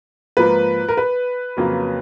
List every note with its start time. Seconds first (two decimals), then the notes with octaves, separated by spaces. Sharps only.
0.37 G#2 F3 A#3 B4
0.88 A#4
0.97 B4
1.57 F2 C#3 F#3 A#3